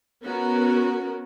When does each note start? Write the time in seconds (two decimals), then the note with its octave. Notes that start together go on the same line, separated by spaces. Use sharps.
0.24 B3 C#4 F#4 A#4